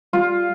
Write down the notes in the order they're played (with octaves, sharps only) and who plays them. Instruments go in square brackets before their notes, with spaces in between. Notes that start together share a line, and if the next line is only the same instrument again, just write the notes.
[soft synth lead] G3 [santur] F4